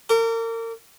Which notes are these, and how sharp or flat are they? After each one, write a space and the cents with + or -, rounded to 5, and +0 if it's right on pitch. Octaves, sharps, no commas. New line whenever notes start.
A#4 -35 D6 -30